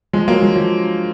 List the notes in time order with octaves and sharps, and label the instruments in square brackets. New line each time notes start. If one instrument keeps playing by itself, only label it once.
[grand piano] F3 G#3
F#3 A#3
F3 G#3
F3